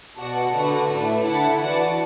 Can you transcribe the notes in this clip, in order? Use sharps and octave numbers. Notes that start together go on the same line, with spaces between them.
B2 F#4 D5 F#5 A5
D3 A3 F#4 B4 D5 F#5
A2 A3 D4 B4 E5
D3 E4 A4 F#5 A5
E3 F#4 B4 D5 F#5 A5